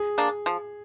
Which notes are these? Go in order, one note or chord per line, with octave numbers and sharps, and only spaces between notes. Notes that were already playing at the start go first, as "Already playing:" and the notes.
Already playing: G#4
A#3 D4
F3